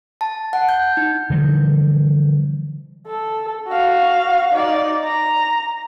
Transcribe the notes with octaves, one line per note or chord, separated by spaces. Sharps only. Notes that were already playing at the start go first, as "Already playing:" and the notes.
A5
F#5
G6
D#4
D3 E3 F3 G3
A4
F#4 F5
D#4 D5
A#5